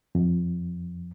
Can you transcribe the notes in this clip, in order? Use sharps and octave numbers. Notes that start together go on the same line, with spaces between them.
F2